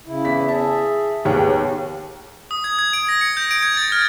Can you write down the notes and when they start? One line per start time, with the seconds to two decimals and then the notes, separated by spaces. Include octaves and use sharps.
0.06 C#3 E4
0.25 E2 B6
0.48 G#4 E5 A5
1.25 D#2 B3 G4 G#4 C#5
2.51 D#6
2.64 G#6
2.79 G#6
2.93 D7
3.09 A#6
3.21 C#7
3.37 G6
3.51 D7
3.63 G#6
3.77 A6
3.92 F6